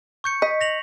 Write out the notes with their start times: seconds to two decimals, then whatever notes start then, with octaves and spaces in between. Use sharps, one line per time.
0.24 C#6 G6 C#7
0.42 D#5 B6
0.61 A#6 F7 F#7